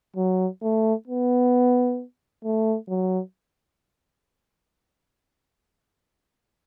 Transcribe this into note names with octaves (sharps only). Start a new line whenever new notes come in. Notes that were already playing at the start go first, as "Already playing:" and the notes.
F#3
A3
B3
A3
F#3